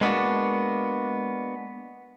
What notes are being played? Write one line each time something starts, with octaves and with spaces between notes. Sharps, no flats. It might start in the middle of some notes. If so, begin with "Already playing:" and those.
G#3 A#3 B3 C#4 D4 F#4